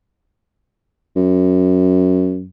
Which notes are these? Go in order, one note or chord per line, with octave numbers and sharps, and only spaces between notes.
F#2